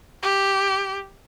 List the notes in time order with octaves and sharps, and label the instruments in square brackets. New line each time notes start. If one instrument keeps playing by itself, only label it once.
[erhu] G4